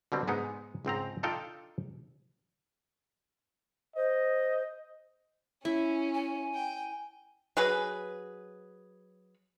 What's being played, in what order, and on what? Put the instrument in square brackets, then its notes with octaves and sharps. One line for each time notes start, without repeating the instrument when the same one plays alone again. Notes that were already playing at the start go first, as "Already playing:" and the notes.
[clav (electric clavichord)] B2 D3 G3 C4
G#2 G#3 B3 D#4
C#2 G#2 C4 A#5
D4 D#4 F4 A4 F5 G5
[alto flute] C5 [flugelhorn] D#5
[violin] C#4 [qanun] E4
[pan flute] G#5
[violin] G5
[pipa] F#3 G#4 B4